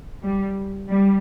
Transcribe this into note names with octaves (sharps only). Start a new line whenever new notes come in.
G3
G3